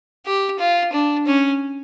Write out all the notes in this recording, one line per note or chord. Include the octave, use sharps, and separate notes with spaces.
G4
F4
D4
C#4